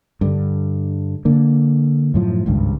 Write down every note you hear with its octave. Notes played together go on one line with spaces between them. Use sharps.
G2 D3
D3 A#3
F#2 A2 F3
G#1 C#2 G2